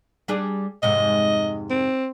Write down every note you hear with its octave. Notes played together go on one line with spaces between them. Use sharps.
G3 D4 G#4
F2 G#2 C3 D#5
C4